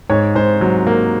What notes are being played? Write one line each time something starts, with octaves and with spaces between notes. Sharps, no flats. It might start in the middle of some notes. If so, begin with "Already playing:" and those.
G#2 C#5
G#2 C5
F#3
A#3